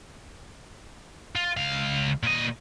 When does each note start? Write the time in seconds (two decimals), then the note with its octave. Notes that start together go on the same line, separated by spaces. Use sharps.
1.35 F4
1.57 C#2 F5
2.23 A#2 D#5